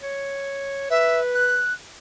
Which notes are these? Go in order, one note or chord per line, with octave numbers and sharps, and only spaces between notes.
C#5
B4 E5
F#6